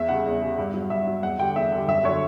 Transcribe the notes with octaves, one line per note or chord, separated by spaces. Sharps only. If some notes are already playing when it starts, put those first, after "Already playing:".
Already playing: E2 E5
C#3 G3 F#5
E2
C#3 G3
G2
F#3
G2 E5
F#3
E2 F#5
D3 G3 G5
E2 E5
D3 G3
F#2 E5
D3 F#3 C#5